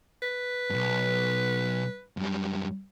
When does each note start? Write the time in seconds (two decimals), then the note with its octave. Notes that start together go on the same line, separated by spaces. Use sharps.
0.22 B4
0.70 B1 G2
2.17 F#2 G3